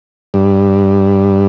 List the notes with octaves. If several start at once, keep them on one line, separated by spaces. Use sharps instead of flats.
G2